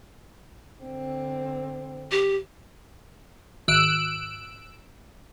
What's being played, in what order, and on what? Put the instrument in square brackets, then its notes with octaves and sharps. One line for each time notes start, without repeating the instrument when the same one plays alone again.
[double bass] D3 C4
[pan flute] G4
[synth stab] G#1 E6 F#6 D7